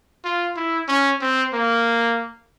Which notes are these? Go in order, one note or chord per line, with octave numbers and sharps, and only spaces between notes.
F4
E4
C#4
C4
A#3